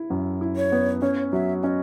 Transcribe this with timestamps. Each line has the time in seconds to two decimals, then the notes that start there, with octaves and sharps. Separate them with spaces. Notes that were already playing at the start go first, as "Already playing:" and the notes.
Already playing: E4
0.10 F#2
0.41 E4
0.56 C#5
0.72 B3
1.02 C#4 C#5
1.33 F#3 E5
1.63 C#4 D#5 E5